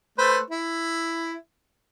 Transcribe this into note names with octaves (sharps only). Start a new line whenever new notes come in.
A3 B4 C5
E4